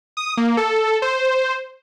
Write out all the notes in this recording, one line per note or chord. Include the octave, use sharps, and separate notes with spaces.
D#6
A#3
A4
C5